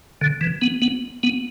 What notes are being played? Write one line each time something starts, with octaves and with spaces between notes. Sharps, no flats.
D3
E3
B3
B3
B3